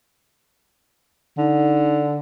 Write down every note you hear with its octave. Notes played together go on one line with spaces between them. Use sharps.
D3 D#4